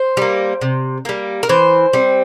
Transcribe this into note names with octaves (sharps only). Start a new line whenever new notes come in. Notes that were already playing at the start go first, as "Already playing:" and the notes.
Already playing: C5
G3 A#3
C3
G3 A#3
A#4
E3 C5
G3 C4